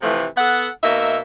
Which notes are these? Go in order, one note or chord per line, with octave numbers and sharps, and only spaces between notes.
C3 E3 F3 A3
B3 A4 F#5
B2 A#3 D#4 E5